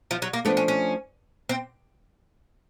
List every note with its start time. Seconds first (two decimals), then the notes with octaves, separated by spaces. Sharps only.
0.11 F3
0.22 F#3
0.33 A#3
0.45 F3 A3 B3 D4
0.57 C#4
0.68 C#4
1.49 C4